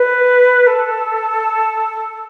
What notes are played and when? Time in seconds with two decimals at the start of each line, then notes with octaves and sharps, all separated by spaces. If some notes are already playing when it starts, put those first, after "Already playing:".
Already playing: B4
0.67 A4